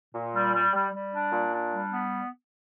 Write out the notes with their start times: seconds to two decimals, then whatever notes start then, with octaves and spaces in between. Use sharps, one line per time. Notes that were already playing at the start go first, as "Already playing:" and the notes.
0.14 A#2
0.34 G3
0.53 G3
0.74 G3
0.93 G3
1.13 D4
1.33 A#2
1.52 D4
1.71 G3
1.91 B3